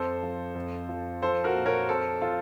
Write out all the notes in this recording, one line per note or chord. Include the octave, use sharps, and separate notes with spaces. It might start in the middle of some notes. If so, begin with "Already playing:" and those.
Already playing: F2 A4 C5
F3
F2
F3
F3 A4 C5
F#4 A#4
A#2
A#4 C#5
F2 A4 C5
F3 F4 A4